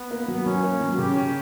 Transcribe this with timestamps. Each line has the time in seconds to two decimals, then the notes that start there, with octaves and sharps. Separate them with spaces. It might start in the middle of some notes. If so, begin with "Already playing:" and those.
Already playing: B3
0.11 A#3
0.28 F#3
0.46 F#3 C#4
0.63 A#3
0.81 F#3
0.98 C#3 G4
1.16 C#4